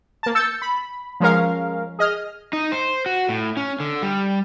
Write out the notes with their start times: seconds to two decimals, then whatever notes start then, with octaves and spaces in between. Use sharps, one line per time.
0.23 A#3 A5
0.35 E6 G6 A6 C#7
0.62 B5
1.20 F3 G#3 C#4 A#4 F5
1.99 G#4 D#5 F6
2.53 D#4
2.72 C5
3.06 F#4
3.29 A2
3.57 C#4
3.80 D3
4.02 G3